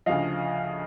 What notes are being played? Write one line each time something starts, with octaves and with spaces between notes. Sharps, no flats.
D2 C#3 F3 D#5 F5